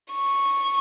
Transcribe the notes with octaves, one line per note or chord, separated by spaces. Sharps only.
C#6